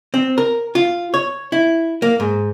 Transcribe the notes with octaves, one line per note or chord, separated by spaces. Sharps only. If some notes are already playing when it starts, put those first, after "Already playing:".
C4
A#4
F4
C#5
E4
A#3
G#2